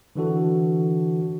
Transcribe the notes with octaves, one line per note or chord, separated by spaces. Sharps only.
D3 E3 D4 F#4 A4